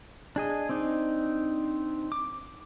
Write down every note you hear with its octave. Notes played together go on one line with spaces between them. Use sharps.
D4 G#4 D#5
C4 D4 D#4
D6